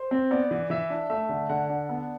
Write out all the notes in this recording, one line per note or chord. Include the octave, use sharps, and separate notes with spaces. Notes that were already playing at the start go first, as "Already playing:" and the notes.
Already playing: C5
C4
B3 D5
E3
E3 E5
D4
A3 E5
D3
D3 F#5
D4
B3